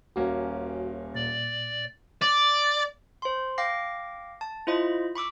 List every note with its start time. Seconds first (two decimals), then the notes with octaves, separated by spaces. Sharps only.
0.16 D#1 A#3 C#4 F#4
1.15 A#2 D5
2.22 D5
3.22 C5 C6
3.58 F5 G5 D6 A#6 C7
4.41 A5
4.67 E4 F4 C5 D#5 B5
5.16 B5 C#6 D6 E6